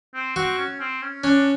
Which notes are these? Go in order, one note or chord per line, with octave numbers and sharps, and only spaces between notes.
C4
C4 F#4
C#4
C4
C#4
C#4 D4